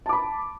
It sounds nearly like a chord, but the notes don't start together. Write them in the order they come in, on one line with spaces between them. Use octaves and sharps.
A5 D6 B5